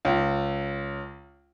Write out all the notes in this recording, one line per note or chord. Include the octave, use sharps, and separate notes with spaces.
C#2